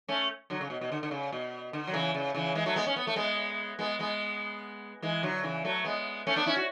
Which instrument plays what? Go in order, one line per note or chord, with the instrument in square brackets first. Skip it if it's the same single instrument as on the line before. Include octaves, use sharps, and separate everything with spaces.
[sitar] A3 C#4
D3 F#3
C#3
B2
B2
D3
D3
C#3
B2
D3
F#3
C#3 E3
C#3
C#3 E3
E3 G#3
F#3 A3
G#3 B3
C#4
B3
A3
G#3 B3
G#3 B3
G#3 B3
E3 G#3
D3 F#3
C#3 E3
F#3 A3
G#3 B3
A3 C#4
B3 D4
C#4 E4
F#4